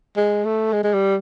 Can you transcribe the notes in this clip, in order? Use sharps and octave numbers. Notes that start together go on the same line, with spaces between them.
G#3
A3
G#3
G#3
G3